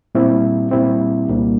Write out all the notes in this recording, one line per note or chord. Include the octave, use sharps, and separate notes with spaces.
A#2 G3 C4 E4
A#2 G3 C4 E4
C2 A#2 G3 A#3 D4